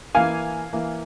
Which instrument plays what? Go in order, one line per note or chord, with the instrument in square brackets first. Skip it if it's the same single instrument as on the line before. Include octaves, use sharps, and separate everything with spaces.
[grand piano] E3 A#3 E4 [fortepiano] F5 G#5
[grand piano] E3 A#3 E4